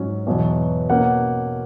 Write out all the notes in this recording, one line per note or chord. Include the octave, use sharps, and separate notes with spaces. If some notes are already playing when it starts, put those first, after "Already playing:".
Already playing: G#2 F#3 C#4
E2 B2 F#3
B2 A#3 C#4 F#5